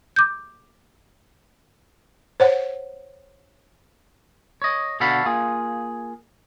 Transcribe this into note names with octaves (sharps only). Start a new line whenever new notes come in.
D6 G6
C5 C#5 F#5
C#5 D#5
B2 D3 F#4 A4 F5 B5
A#3 F4 G#4